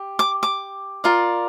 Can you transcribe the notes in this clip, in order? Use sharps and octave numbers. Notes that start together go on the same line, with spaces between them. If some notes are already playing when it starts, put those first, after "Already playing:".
Already playing: G4
D6
D6
F4 A#4 D5